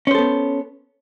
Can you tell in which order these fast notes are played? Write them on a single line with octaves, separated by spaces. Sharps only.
C#4 C5 A4 B3